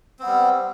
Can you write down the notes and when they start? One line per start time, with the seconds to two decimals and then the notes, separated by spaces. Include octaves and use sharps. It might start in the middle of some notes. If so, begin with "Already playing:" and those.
0.19 C4
0.23 B3
0.26 G3